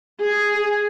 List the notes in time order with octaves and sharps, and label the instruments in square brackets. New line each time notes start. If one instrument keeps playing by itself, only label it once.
[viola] G#4